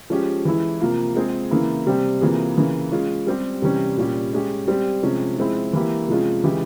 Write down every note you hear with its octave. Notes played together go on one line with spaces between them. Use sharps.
F3 G#3 C#4 G4
E3 G#3 E4
C3 F3 A#3 F4
G#3 C4 F4 G#4
C#3 E3 A#3 E4
C3 G3 C4 G4
C3 E3 A#3 F4 G#4
C#3 E3 A#3
G#3 C#4 F4
G3 C4 G4
C3 E3 G3 C#4
A#2 G3 C#4 G4
G#3 C#4 G4
G3 C4 G4
C3 F3 G#3 C#4
F3 G#3 C4 E4
E3 A#3 E4 G4
C3 F3 G#3 C#4 F4
C#3 E3 G#3 E4 G4